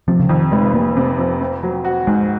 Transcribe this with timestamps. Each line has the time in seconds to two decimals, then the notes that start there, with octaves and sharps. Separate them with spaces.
0.08 C3 F3
0.20 C#3
0.29 F2 D#3
0.52 F1 G#3
0.74 F1 A#3
0.97 C3
1.18 F2
1.41 C4
1.63 F#3
1.85 F#4
2.07 G#2 G#3